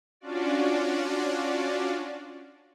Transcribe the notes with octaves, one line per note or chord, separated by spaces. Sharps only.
C#4 D4 F4 F#4 D5